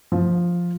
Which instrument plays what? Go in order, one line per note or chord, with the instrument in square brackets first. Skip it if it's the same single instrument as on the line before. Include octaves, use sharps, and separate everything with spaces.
[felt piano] F3